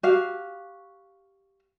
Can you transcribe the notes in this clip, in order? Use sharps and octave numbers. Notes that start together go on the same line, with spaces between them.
F#4 G4 F5